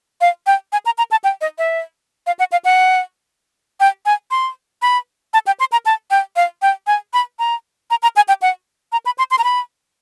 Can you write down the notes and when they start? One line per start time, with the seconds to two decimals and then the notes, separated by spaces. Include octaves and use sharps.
0.21 F5
0.47 G5
0.72 G#5
0.86 A#5
0.98 A#5
1.11 A5
1.24 G5
1.41 D#5
1.58 E5
2.27 F5
2.39 F#5
2.52 F5
2.65 F#5
3.80 G5
4.06 G#5
4.31 C6
4.82 B5
5.34 A5
5.47 G5
5.60 C6
5.72 A#5
5.86 A5
6.11 G5
6.36 F5
6.62 G5
6.87 G#5
7.13 B5
7.39 A#5
7.90 A#5
8.03 A#5
8.16 G#5
8.28 G5
8.42 F#5
8.92 A#5
9.06 B5
9.18 C6
9.31 C6
9.39 A#5
9.44 B5